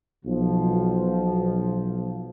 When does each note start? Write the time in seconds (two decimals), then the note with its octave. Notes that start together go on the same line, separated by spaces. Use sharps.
0.25 B1 B2 F3